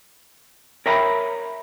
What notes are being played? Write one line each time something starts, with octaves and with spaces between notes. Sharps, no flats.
A#4 C#5 E5 G5 A#5 B5